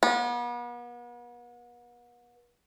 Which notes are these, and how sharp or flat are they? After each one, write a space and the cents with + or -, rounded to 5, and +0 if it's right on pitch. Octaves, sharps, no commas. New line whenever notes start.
B3 -40